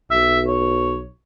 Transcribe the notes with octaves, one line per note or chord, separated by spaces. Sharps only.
B1 E5
C#5